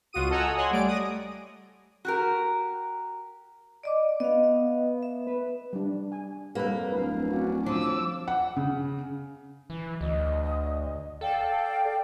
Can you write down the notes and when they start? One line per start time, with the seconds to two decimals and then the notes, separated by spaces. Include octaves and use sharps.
0.13 C#2 F4 F#4 D#6 D#7
0.30 A4 D#5 F#5 G#5 A#5 E6
0.56 C#5 F#5 G#5 C6
0.71 G3 A3 D5 D7
0.87 D#6 A#6
2.05 F#4 G4 A#4
3.83 D5 D#5 D6
4.20 B3 D#5 F5
5.03 E5
5.27 B4
5.73 G3 D4
6.12 G#5
6.55 F2 G3 A#3 A4 B4
6.92 D1 B4 F5
7.31 C#4 D4 F#4
7.66 F3 D6 E6
8.28 F#5
8.56 C#3
9.70 E3
10.01 D2 D#5
11.21 A4 D5 F5 G5